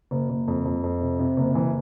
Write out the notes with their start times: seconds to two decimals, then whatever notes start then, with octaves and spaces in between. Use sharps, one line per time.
0.11 F#1
0.30 F#1
0.48 F2
0.65 F2
0.83 F2
1.01 C3
1.19 C3
1.37 F#1
1.55 E3